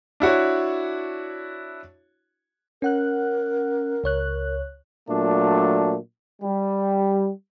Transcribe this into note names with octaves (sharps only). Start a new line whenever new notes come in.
D4 E4 F#4 C#5
C#4 A#4 F#5 F#6
C#2 C#5 F#6
A#2 F#3 A3 D4
G3